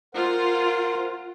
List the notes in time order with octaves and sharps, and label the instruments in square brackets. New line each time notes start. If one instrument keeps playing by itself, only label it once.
[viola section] F4 [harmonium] A#4 C5 F#5